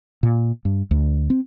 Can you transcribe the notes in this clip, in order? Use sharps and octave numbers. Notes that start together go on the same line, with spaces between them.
A#2
G2
D2
C4